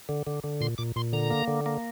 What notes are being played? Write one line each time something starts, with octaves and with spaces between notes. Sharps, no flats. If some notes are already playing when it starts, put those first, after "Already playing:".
D3
D3
D3
A#2 C6
A#2 D6
A#2 C6
D3 A#5
A#3
D3
A#3